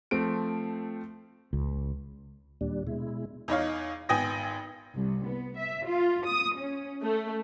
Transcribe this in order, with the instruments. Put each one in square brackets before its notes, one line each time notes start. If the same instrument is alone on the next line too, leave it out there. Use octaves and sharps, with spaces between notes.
[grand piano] F3 A3 C4 D7
[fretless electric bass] C#2
[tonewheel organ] D#2 A#2 G3 D4
B2 G#3 E4
[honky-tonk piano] E2 D#4 C#5 F5
G#1 B3 G5 G#5 D#6 A#6
[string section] C2
B3
E5
F4
D#6
C#4
A3